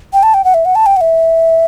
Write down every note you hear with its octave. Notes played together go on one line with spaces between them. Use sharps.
G5
A5
G5
F#5
E5
F#5
A5
G5
F#5
E5